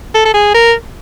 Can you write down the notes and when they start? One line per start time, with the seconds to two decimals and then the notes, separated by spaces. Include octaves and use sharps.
0.14 A4
0.25 A4
0.34 G#4
0.54 A#4